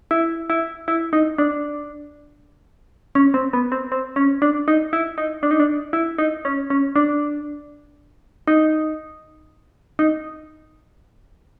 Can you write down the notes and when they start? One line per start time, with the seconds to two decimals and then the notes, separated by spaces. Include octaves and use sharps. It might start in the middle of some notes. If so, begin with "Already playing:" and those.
0.11 E4
0.50 E4
0.88 E4
1.13 D#4
1.38 D4
3.15 C#4
3.34 C4
3.53 B3
3.72 C4
3.92 C4
4.16 C#4
4.42 D4
4.68 D#4
4.93 E4
5.18 D#4
5.43 D4
5.51 D#4
5.60 D4
5.93 E4
6.18 D#4
6.45 C#4
6.70 C#4
6.96 D4
8.48 D#4
9.99 D#4